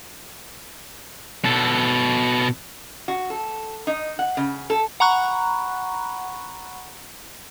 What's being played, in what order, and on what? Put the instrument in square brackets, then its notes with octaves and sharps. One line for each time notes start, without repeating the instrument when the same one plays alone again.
[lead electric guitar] B2 A4
[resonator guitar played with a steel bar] F#4
A4
D#4
F#5
C#3
A4
[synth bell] F#5 A#5 B5 C#6 F#6